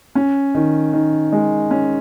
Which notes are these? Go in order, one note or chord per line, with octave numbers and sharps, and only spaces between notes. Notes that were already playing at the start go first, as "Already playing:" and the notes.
C#4
D#3
D#3
G#3
C#4